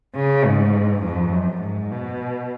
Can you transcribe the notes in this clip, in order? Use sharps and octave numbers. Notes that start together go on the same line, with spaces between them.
C#3
G#2
F2
F#2
G#2
B2